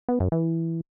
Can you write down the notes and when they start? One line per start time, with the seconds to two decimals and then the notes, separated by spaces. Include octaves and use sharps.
0.09 B3
0.20 F#2
0.32 E3